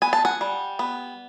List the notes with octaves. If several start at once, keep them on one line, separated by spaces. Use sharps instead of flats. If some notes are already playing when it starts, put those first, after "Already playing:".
B3 G#5
A5
F#5 G#5
G3
B3